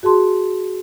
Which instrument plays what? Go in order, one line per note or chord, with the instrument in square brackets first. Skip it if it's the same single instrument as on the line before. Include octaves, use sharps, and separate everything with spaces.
[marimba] F#4 G#4 A5 C6